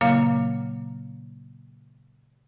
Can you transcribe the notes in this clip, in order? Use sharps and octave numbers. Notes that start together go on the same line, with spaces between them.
A#2 C#3 F#3 A#3 F5